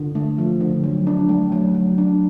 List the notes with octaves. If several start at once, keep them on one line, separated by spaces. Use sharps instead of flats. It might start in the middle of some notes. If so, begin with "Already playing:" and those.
Already playing: D3
A3
F3
D3
F#3
D4
A3
F#3
F#3
D4